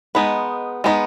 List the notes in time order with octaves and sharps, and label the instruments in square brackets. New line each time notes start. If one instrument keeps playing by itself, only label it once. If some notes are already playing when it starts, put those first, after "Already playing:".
[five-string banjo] G#3 B3 D#4 B4
G#3 B3 D#4